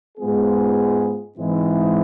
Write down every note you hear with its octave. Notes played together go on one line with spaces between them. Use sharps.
G#2 G#3 B3 F4 G#4
G#2 E3 G#3 C4 E4